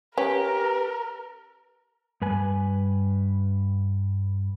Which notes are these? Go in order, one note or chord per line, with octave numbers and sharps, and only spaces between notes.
C#4 G4 A#4 B4
G2 B4 G#5